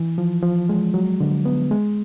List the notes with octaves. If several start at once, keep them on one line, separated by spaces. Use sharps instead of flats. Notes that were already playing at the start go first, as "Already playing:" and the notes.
Already playing: E3
F3
F3
G#3
F#3
D3
B3
G#3